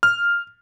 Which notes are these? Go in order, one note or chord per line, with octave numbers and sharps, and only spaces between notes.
F6